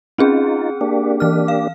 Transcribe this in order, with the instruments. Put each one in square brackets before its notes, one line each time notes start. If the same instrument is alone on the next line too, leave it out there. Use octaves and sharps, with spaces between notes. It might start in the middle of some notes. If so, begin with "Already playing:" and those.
[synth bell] C4 C#4 G#4 [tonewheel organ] D#4 F4
[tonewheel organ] A#3 D4 G4
[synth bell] E3 F6
F5